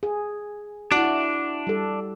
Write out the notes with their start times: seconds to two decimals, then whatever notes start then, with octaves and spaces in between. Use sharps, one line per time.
0.03 G#4
0.92 D4 E4 F#4
1.67 G3 A4